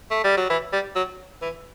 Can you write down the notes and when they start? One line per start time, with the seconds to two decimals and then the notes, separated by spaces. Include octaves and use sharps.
0.11 A3
0.24 G3
0.37 F#3
0.50 E3
0.73 G3
0.95 F#3
1.42 E3